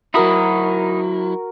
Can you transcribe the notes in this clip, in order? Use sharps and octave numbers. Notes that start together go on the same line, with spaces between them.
F#3 D#4 E4 F#4 A#4 B5 D#6